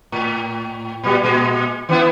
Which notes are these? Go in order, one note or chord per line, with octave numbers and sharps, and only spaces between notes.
A2
A#2 G3 B3
A#2 G#3
E3 B3 E4